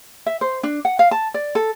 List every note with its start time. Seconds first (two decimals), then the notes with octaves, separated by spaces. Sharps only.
0.26 E5
0.41 C5
0.63 D4
0.85 F#5
0.99 F5
1.11 A5
1.34 D5
1.55 A4